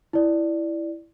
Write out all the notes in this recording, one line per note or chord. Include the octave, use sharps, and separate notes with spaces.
E4 D5